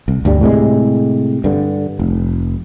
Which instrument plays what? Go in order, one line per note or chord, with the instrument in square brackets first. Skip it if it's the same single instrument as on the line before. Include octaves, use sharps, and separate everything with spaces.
[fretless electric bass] C2
D2 G2 G3
A2 C3 G#3
G2 D3
F1